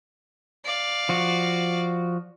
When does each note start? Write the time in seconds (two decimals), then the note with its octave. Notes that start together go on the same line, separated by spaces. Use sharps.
0.65 D5 F5
1.09 F3 F#4